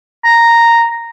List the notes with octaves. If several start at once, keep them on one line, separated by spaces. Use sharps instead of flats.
A#5